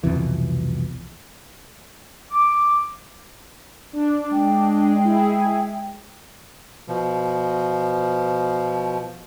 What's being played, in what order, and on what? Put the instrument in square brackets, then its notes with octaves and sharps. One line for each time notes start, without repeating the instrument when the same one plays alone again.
[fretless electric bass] C2 F2 B2 E3
[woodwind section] D6
[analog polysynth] D4
[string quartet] G#3 [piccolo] G5
[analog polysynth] E4 G#4
[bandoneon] B2 F3